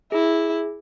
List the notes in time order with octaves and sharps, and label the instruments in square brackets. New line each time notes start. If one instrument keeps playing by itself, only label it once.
[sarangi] E4 [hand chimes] G#4